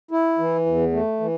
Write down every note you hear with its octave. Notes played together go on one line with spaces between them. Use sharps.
E4
E3
E2
A3
E3